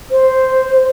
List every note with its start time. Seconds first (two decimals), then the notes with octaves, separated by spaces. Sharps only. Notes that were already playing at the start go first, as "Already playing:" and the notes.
0.11 C5